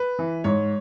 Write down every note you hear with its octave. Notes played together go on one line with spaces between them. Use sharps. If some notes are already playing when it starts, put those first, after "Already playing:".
Already playing: B4
E3
G#2 C#5